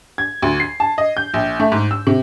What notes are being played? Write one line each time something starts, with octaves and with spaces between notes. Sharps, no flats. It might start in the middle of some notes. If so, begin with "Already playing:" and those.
G#6
D2
C7
A5
D#5
G6
A#1
A3
G#2
E6
C3